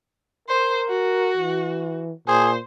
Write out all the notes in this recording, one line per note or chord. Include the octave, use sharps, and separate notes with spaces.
A#4 C5
F#4
E3
A#2 G#4 C5